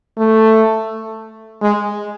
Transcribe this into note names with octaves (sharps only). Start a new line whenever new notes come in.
A3
G#3